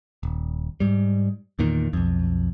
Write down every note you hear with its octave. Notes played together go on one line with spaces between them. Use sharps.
D#1
G#2 G3
E2 A#2 D#3
B1 F2